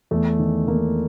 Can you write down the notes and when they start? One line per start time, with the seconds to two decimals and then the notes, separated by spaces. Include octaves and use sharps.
0.11 E2 A3
0.39 D#3
0.67 D#3 A#3